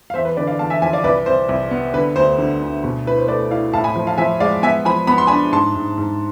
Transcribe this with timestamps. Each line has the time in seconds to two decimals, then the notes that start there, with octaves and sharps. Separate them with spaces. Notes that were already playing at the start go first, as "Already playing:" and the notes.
0.10 F5
0.14 E2 C5 E5
0.25 B4
0.37 D3 B4 D5
0.47 D5 F5
0.59 E2 F5 A5
0.70 E5 G#5
0.82 F3 E5 G#5
0.93 D5 F5
1.04 C2 B4 D5
1.26 C2 C5
1.49 C2
1.71 B3
1.94 D3 B4
2.16 D2 C5
2.38 D3
2.61 D2
2.84 B2
3.06 E4 B4
3.18 C5
3.28 A3 B4 D5
3.51 E4 D5 F5
3.73 A2 F5 A5
3.84 G#5 B5
3.96 F3
4.07 F5 A5
4.18 F3 E5 G#5
4.40 G#3 D5 F5
4.63 B3 E5 G#5
4.85 F3 G#5 B5
5.07 B3 B5
5.18 C6
5.27 D4 G#5 B5
5.52 G#2 A5 C6
5.75 G#2
5.98 G#2